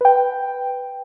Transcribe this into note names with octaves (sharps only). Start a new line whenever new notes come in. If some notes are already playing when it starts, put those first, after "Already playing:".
B4 G5